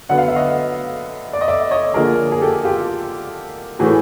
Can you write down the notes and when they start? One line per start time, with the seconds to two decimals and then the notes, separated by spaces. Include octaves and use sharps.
0.09 D3 F#3 B3 F#5
0.18 F5
0.28 E5
0.35 D#5 F5
1.33 D5
1.41 D#5
1.48 D5 E5
1.71 C#5 D#5
1.94 D3 F3 A#3 G#4 A#4
2.32 G#4
2.41 G4 A4
2.65 F4 G4
3.79 A2 E3 A3 F#4 G#4